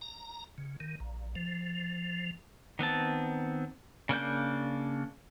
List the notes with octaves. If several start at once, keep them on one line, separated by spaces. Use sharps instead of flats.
A#5
C#3
D#3
A#1
F3
D#3 B3 C4 A5
C#3 A#3 D4 G6